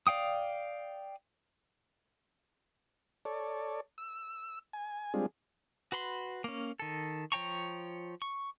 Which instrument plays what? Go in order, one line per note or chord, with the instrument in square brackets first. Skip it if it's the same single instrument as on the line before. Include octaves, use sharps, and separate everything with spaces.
[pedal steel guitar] D5 F5 G5 D#6
[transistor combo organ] A4 C#5 D5
E6
G#5
G3 G#3 C4 D4 F4 G#4
[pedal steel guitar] F#4 B4 B5 C6
A#3 C#4
D#3 A4
F3 C#5 G5 A#5 C#6
C#6